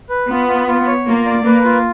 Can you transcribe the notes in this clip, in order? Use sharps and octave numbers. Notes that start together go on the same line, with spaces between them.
B4
B3 F4
F4
F4
C#5
A#3 F4
D5
A#3 B4
F4